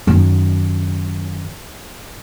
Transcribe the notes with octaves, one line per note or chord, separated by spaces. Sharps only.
F#2 D#3